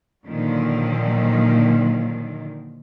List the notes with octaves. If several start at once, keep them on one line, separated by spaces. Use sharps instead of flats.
A#2 D3 D#3 F3 F#3